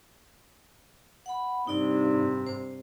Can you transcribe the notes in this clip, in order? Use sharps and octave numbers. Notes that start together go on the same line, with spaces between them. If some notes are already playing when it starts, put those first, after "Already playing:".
F#5 B5
G2 C3 D#4 D5
C5